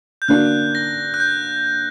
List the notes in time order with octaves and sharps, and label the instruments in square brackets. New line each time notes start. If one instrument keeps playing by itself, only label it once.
[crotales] G6
[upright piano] D3 A#3 D4 F#4 [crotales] F#6
[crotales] A#6
F#6
G6